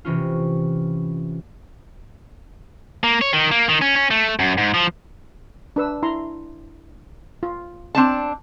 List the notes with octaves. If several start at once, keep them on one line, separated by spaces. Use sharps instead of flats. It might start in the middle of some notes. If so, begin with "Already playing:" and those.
C3 E3 C#4 F4
A#3
C#5
D#3
A#3
D#3
C#4
C#4
A3
F#2
G#2
F3
D4 B4 E6
E4 A#5 C6
F4
C4 D4 A5